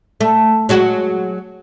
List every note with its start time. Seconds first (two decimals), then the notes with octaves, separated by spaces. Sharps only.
0.21 A3
0.69 F#3 G#3 F#4